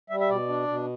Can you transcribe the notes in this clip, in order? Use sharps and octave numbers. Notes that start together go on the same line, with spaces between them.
G3 E5
E5
B2 D5
D4
B2